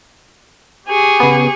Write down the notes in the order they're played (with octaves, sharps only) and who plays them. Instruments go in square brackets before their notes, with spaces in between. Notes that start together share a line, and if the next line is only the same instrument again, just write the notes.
[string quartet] G4 G#4 C#6
[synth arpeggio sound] C#3 B3